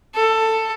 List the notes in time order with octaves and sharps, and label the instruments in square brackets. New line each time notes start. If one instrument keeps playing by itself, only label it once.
[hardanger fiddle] A4